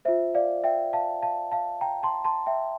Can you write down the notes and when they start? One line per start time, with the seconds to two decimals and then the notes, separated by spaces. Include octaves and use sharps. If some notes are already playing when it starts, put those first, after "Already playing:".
0.05 F4 C5 E5
0.35 D5 F5
0.64 E5 G5
0.93 F5 A5
1.22 F5 A5
1.52 F5 A5
1.81 G5 A#5
2.03 A5 C6
2.24 A5 C6
2.46 E5 G5